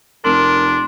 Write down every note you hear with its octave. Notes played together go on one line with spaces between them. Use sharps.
F1 D4 A#4 C6